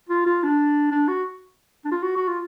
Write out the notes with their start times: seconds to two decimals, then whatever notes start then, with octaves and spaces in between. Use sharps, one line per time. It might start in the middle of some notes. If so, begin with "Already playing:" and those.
0.09 F4
0.26 F4
0.43 D4
0.92 D4
1.08 F#4
1.85 D4
1.92 F4
2.03 F#4
2.16 F#4
2.28 F4